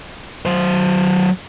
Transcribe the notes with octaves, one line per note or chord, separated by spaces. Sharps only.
F#3 C5